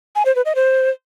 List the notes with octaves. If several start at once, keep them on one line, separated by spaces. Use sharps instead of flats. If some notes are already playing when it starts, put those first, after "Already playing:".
G#5
C5
B4
D#5
C5